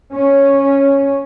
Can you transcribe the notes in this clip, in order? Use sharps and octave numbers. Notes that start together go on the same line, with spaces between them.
C#4